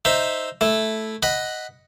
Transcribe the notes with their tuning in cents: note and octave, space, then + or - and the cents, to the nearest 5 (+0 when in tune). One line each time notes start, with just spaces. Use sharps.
D#4 +0 C5 +0 E5 +0
A3 -5 E4 +0
D#5 +0 F#5 +0 B5 +0